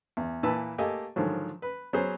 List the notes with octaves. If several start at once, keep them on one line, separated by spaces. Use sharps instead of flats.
E2
A#2 E3 B4 A5 E6
A3 A#3 G4 A4 D#5 G#5
G#2 D3 D#3 F3 F#3
B4
F#3 B3 G#4 C5